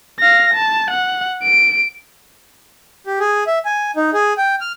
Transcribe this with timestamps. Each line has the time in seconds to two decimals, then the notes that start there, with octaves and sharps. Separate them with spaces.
0.20 F5 A#6
0.54 A5
0.91 F#5
1.43 D7
3.07 G4
3.20 G#4
3.47 E5
3.65 G#5
3.96 D#4
4.14 G#4
4.37 G5
4.61 F6